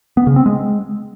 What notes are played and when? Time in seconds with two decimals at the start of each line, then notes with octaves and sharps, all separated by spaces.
0.17 B3
0.27 C#3
0.36 C4
0.46 G#3